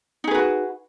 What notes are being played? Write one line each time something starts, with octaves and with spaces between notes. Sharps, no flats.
D#4 F#4 G#4 B4